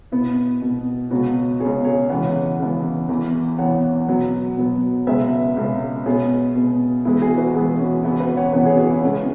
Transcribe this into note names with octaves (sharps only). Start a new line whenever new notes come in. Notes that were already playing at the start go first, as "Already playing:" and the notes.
B2 B3 E4
B2 B3
C#2 B2 B3 C#4 F#4
C#2 B2 B3 G#4 C#5
G#4 C#5
C#2 C#3 E3 B3 C#5 F#5
C#2 C#3 E3 B3
E2 E3 B3
E2 E3 B3 C#5 F#5
B2 F#3 B3
B2 F#3 B3
C#2 B2 G#3 B3 B4 E5
C#2 B2 G#3 B3
B2 B3 G#4 C#5
B2 B3
E2 E3 G#3 B3 E4
E4 G#4
F#4 B4
E2 E3 G#3 B3 E4 G#4
C#4 F#4
E2 C#3 E3 B3 E4 G#4
F#4 B4
C#5 F#5
E2 C#3 E3 B3 C#5 F#5
G#4 C#5
G#4 C#5
E4
E2 C#3 G#3 B3 C#4